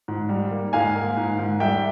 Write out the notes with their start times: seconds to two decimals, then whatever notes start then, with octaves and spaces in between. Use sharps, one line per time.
0.08 G#2
0.29 G3
0.51 A#3
0.73 G#2 F5 G#5
0.95 A#3
1.17 G#2
1.39 G#2
1.60 G3 E5 G5